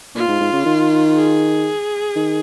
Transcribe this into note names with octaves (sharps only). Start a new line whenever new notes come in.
A#2 F4
G#2
G#2
C#3
D#3
G#4
D#3